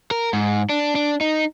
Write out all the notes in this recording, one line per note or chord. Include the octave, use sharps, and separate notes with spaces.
A#4
G#2
D4
D4
D#4